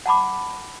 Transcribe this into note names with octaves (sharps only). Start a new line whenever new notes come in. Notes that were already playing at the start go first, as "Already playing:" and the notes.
F#5 A5 B5 D6